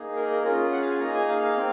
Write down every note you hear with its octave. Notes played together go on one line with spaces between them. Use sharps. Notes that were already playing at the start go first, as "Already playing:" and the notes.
Already playing: A#3 D#4 G#4
A#4
A#4
C#4 F4 G#4 A#4
F#5
F5
G#5
A#3 D#4 G#4 A#5
G#5
F5
F5
C4